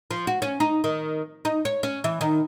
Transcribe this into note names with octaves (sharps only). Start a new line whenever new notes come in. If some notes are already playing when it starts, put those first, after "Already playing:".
F3
F#4
C#4
D#4
D#3
D#4
C#5
C#4
E3
D#3